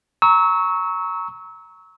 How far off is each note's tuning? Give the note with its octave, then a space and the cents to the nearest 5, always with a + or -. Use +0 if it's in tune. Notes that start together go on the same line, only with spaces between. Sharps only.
A#5 +0 C#6 +0 E6 -30